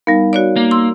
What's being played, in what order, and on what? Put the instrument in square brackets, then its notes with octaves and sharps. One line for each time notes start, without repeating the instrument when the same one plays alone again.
[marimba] G3 B3 [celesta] D#4 A#4 F5
[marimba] F#4 C#5 D5
[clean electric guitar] A#3
[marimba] C6 E6